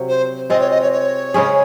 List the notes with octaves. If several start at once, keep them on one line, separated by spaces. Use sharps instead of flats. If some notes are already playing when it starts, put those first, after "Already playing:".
Already playing: C3 F#3
C5
G#3 C4 F4 D#5
C#5
D#5
C#5
C#5
C#3 G#3 C#4 G#4